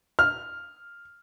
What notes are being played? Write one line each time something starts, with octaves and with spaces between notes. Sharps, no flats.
F6